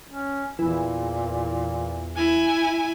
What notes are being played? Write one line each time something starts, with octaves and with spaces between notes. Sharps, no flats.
C#4
E2 A#2 E3
E4 G#5